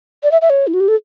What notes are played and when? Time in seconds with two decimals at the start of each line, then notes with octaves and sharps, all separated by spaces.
0.23 D5
0.31 E5
0.42 E5
0.50 C#5
0.67 E4
0.74 F#4
0.80 G4
0.88 A4